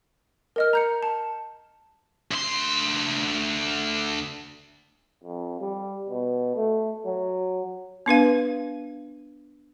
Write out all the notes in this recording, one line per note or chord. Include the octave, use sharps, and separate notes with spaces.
A#4 D#5 F6
A#5 G6 C#7
A5
D2 C6
F2
G3
B2
A3
F#3
B3 D4 B4 F5